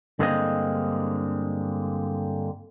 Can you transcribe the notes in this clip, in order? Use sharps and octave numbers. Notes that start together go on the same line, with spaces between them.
G2 D3 G#3 A#3 C4 D#5